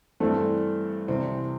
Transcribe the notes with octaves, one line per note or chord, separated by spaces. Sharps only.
G2 E3 A3 C4 A4
C2 C3 E3 C4